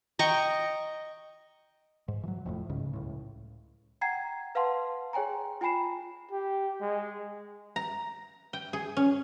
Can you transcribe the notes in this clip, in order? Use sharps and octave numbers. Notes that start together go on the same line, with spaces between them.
D#5 G5 A#5 C#6
G#2
E3 F#3
F1 F2 A2
C#2 G#2 C#3
C#2 A2
F#5 G5 A#5 G#6 C7
B4 F5 F#5 A5 C6
G#4 C#5 G5 G#5 A#5
F4 G5 G#5 B5 C7 E7
G4
G#3
A#5
G5
G#4
C#4